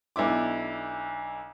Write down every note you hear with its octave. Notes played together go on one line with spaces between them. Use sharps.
B1 D4 E4 D6